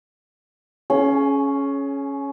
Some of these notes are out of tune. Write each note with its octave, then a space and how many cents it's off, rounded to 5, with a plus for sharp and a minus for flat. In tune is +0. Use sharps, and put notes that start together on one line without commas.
C#4 +0 G#4 +30